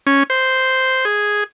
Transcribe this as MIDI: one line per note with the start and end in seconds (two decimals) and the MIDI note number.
0.07 0.23 61
0.30 1.05 72
1.05 1.44 68